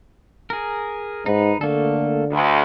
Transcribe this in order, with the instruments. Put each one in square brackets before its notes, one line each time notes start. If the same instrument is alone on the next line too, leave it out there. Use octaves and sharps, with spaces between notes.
[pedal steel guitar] G#4 A#4
[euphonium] G#2 [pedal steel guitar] D#4 B4
[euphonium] D3 [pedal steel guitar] A3 A#3 A4
[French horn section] D2